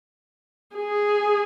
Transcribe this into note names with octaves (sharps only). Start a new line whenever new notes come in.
G#4